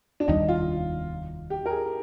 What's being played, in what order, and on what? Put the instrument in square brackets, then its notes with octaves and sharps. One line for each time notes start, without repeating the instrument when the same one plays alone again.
[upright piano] D4
[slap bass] F1 D#2 D#3 G3 [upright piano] D#4
[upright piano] F4
G4
A#4
G#4